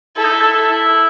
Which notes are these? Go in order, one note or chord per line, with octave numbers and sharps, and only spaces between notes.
E4 A4
D#4
E4
E4